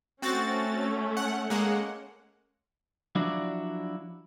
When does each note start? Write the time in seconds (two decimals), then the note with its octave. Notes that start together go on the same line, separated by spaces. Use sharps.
0.22 A3 C4 C#4 F#4 A6
1.17 F#5
1.50 G#3 A#3 F#5
3.15 F3 F#3 D4 E4 F#4 D5